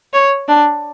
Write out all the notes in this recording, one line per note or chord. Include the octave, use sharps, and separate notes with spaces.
C#5
D4